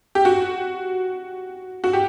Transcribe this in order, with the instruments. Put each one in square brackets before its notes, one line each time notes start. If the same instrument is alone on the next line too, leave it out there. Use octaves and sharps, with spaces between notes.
[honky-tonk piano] G4
F#4
F#4
G4